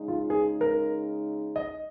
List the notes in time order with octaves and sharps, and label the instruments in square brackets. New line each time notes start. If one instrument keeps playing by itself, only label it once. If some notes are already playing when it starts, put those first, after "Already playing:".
Already playing: [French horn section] C#3 G#3 D#4
[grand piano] F4
G#4
A#4
D#5